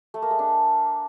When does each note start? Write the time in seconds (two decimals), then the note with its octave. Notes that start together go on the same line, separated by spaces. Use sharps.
0.14 A3
0.22 A#3
0.31 G#3
0.39 D4